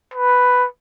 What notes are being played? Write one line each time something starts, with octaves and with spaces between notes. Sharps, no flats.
B4